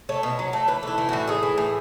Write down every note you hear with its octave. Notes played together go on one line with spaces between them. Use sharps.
A3 C#5
B2
F#3
A3
E3 B4
A3 E4
E3
A2 F#4
A2 G#4
E3
A2